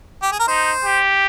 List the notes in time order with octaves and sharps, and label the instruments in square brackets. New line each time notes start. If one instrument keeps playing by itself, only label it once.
[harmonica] G4
G#4
A#4
[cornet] D#4 [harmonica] C5
[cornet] G4